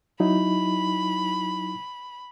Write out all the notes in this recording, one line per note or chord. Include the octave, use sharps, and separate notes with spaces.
F#3 D#4 E4 B5